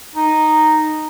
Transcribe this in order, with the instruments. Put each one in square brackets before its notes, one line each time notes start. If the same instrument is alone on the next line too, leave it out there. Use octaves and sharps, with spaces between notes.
[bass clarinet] D#4